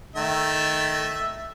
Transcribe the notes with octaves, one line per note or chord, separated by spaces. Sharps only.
D#3 A3 E5